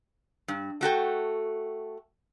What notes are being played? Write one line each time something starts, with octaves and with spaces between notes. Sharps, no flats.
G2
A3 F#4 A4 G5